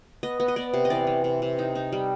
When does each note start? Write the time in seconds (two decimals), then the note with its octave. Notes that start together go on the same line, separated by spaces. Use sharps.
0.23 B3 D#5
0.40 B3
0.48 D#5
0.56 B3 D5
0.74 C3
0.85 D#5
0.90 E3 D5
1.07 E3
1.24 C3
1.42 C3
1.59 D#4
1.75 D#4
1.93 G3